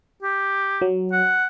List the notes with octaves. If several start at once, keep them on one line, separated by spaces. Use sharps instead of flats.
G4
F#3
F#5